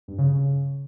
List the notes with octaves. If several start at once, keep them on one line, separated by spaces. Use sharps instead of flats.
G2
C#3
C#3